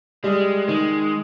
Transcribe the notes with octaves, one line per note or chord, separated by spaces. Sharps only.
G3 G#3
D#3 G#3